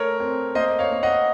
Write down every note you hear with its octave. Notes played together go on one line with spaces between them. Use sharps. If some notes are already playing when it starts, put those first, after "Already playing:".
Already playing: A3 A#4 C#5
C4
A#3 C5 D#5
C#5 F5
A#3
D#5 F#5